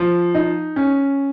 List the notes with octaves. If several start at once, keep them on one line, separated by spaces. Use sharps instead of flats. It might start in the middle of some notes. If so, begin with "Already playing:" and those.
Already playing: F3
D#4
C#4